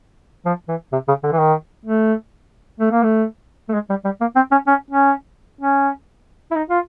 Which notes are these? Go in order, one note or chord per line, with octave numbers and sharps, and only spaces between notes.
F3
E3
C3
C#3
D3
E3
D#3
A3
A3
A#3
A3
A3
G#3
G3
G3
A#3
C4
C#4
C#4
C#4
C#4
E4
D#4
F4